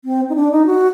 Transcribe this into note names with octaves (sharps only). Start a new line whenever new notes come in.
C4
D#4
D4
D#4
F#4